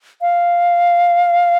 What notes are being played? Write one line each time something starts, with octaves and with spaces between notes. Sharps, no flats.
F5